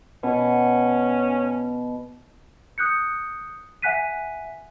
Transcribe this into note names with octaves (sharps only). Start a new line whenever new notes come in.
B2 C#4
D#6 F#6 G6 C#7
E5 F#5 G#5 F#6 B6 D#7